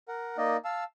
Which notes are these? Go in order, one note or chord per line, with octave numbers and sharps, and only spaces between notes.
A#4 F#5
A#3 D#4 D5 D#5
F5 A5 E6